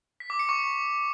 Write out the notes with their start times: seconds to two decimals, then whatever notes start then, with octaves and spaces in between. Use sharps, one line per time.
0.20 B6
0.30 D6
0.39 C#7
0.49 C#6